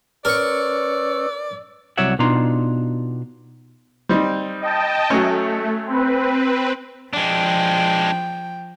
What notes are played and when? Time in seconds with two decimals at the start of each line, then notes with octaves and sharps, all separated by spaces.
0.25 C#4 A#4 B4 C#5 D5 C#6 E6
1.97 C2 F#3 C#5 D5 E5 F#5
2.19 B2 D4 D#4 F4 A#5 C6
4.09 G3 C4 D#4
4.61 D#5 G5 A5
5.10 F#3 A3 C#4
5.86 C4 B4
7.13 F3 G#3 D4 G5